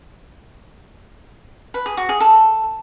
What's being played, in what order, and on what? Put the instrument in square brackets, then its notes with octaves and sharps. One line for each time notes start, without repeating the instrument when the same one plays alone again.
[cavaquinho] B4
G#4
F#4
G#4
A4